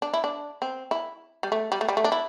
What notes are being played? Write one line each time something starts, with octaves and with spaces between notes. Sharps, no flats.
D4
E4
D4
C4
E4
G3
A3
G3
A3
G3
A3
D4
E4